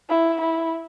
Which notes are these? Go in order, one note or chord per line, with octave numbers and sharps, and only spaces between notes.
E4
E4